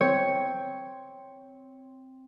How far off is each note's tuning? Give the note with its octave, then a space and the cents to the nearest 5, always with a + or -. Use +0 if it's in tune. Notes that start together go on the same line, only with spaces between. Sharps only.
C4 +0 C#5 +0